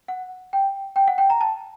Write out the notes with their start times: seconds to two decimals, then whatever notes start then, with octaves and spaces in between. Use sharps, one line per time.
0.08 F#5
0.53 G5
0.96 G5
1.08 F#5
1.18 G5
1.30 A#5
1.41 A5